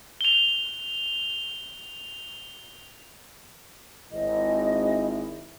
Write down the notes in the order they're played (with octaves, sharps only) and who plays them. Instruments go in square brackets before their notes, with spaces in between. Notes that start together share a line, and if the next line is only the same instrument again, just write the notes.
[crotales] F7 G7
[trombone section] G#1 E4 [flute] D#5